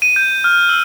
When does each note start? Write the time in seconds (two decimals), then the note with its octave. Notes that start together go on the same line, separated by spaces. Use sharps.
0.02 D#7
0.16 G6
0.44 F6
0.69 E6